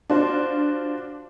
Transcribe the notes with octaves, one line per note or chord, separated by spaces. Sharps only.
D4 F4 F#4 C5